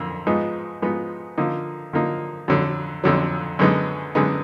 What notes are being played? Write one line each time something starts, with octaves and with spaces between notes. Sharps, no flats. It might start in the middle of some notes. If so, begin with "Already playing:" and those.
Already playing: F2 D3 A#3
G#2 F3 B3 D#4
G#2 F3 B3 D#4
D3 F3 A#3 D#4
D3 F3 A#3 D#4
F2 D3 F#3
F2 D3 F#3
F#2 D3 G#3 B3 D#4
F#2 D3 G#3 B3 D#4